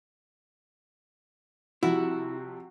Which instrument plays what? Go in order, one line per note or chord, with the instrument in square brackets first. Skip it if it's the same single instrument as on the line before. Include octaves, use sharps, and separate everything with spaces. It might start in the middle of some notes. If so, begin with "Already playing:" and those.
[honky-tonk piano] C3 F3 G3 [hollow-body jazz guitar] E4 [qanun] F#4